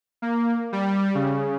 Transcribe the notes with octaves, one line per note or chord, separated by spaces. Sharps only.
A#3
G3
C#3